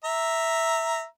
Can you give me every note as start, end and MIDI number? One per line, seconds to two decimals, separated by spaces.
0.04 1.04 76
0.04 1.04 82